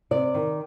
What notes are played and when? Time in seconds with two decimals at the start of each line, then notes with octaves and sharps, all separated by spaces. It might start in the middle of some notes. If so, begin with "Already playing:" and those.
0.11 C3 D5
0.34 D#3